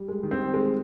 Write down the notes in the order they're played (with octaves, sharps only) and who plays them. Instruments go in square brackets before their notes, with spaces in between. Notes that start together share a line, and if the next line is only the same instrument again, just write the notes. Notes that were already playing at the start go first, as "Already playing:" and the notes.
Already playing: [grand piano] G3
[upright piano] G#3
[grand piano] D#3
[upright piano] C4
G#3